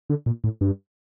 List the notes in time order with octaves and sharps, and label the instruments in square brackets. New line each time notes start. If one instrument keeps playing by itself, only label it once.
[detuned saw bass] D3
A#2
A2
G2